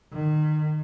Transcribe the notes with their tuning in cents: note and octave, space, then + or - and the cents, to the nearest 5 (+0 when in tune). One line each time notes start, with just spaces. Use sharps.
D#3 -30